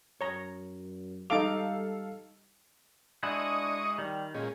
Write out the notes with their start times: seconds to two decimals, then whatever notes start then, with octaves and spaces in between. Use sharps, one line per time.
0.21 F#2 C#5 A#5
1.30 G3 D#4 A4 F5 D6 F7
3.23 G#3 D4 E4 F#4 D#5 C#6 D#6
3.98 D#3 G3
4.34 A#2 G#3 C#4